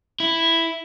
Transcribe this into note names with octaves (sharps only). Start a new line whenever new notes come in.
E4